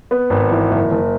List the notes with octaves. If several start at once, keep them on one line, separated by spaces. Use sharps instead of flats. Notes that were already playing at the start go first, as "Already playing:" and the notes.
B3
G#1
E3
F#1
F#1